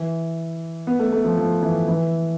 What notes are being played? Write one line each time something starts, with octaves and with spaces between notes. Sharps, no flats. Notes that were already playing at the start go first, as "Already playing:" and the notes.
Already playing: E3
B3
A3
A3
F3
F3
E3
E3